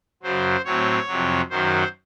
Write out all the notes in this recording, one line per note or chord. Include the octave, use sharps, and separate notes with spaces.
F#2 C#3 F#3 C5
A2 F#3 C4 C#5
F2 C3 F#3
F#2 D#3 F#3 C5